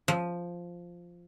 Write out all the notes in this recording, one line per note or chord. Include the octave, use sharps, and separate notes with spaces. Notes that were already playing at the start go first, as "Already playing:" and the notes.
F3